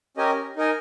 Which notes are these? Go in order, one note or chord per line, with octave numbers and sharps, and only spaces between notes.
C#4 G4 A#4 D#5 G#5
D#4 A#4 D#5 G#5